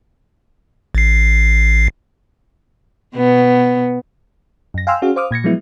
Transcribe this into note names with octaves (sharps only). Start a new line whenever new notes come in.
A1 C7
B2 B3
F#2 A#6
F5 G5 G#5 C6 E6 F6
C#4 F#4 G#4 F5
C5 F5 D6 D#6 F6
A#2 G#6 A#6 C#7
F3 F#3 G#3 B3 E4